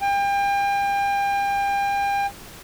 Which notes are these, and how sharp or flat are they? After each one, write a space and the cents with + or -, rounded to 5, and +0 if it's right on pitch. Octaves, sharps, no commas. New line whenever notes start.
G5 +35